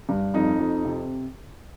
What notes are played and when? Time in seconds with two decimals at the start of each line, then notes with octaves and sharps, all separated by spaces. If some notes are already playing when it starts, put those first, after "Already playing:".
0.09 G2
0.34 F2 D#4
0.59 F2
0.85 C3